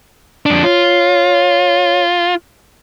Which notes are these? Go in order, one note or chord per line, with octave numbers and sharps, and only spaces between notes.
F2 D4
F4 C#5